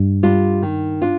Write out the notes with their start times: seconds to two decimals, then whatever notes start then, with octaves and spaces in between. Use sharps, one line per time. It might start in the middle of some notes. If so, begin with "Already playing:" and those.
Already playing: G2
0.23 G3 D4 F4
0.62 D#3
1.02 D4 F4